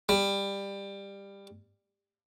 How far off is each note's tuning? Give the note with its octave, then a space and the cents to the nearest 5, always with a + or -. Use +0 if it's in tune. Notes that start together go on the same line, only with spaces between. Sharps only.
G3 +15